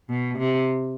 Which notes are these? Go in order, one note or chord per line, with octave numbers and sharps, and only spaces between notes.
B2
C3